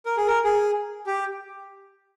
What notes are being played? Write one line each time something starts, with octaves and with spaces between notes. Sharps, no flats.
A#4
G#4
A#4
G#4
G4